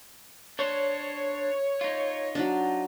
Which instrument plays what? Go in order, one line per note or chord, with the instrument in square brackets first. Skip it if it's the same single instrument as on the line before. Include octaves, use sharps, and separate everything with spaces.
[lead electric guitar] D4 C5 [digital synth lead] C#5
[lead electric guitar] D#4 F4
[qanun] F#3 D4